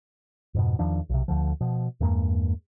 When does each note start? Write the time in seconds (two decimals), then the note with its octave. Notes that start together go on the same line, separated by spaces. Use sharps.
0.54 F2 G#2 B2
0.79 E2 D#3 F3 D4
1.09 B1 C3
1.28 D2 D3 F3
1.61 B2 F3
2.00 E2 G2 G#3 A#3